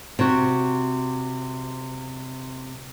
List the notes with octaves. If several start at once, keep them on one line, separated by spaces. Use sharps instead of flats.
C3 F#4